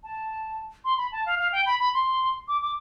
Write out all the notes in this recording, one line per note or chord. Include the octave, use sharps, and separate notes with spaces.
A5
C6
B5
A5
F5
F5
G5
B5
B5
C6
D6
D6